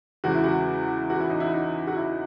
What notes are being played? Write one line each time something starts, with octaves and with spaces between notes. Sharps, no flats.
E2 C#3 G#3 F#4
E4
F#4
F#4
E4
D#4
E4
D#4
F#4
E4